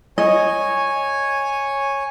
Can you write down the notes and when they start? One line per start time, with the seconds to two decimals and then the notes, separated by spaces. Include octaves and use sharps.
0.18 C#5 D#5 G#5